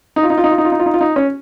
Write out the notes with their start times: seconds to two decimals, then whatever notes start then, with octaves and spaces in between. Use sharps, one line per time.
0.16 D#4
0.23 F4
0.30 D#4
0.38 F4
0.44 D#4
0.51 F4
0.58 D#4
0.65 F4
0.72 D#4
0.79 F4
0.86 D#4
0.94 F4
1.01 D#4
1.16 C#4